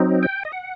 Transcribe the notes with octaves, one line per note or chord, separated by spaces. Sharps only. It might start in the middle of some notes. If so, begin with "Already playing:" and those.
Already playing: F#3 C4 D#4
G5
D#5
F#5